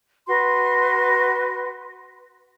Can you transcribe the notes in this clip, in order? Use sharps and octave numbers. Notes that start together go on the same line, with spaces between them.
F#4 B4 C6